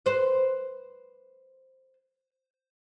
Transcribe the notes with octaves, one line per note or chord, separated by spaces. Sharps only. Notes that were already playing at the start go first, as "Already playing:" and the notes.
B4 C5